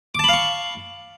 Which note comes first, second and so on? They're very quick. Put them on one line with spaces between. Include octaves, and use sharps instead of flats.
D6 A5 B5 F5 C#6